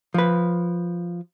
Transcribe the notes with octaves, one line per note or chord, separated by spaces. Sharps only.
F3 B4